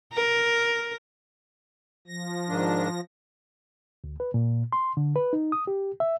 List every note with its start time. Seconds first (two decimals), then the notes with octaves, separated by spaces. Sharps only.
0.13 A#4
2.08 F3 A#6
2.49 G#2 D#3 D4
4.04 D2
4.20 B4
4.34 A#2
4.73 C6
4.97 D3
5.16 B4
5.33 D#4
5.52 D#6
5.67 G4
6.00 E5